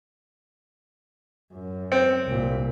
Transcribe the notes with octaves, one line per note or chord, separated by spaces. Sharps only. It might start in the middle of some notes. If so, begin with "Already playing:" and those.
F#2
C4
C2 A#2